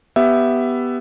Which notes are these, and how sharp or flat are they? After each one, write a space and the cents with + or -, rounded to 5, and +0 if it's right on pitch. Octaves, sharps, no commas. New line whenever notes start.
B3 +0 G4 +0 E5 +10